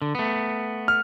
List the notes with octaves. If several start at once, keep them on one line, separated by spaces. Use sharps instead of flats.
D3
A3 B3
F6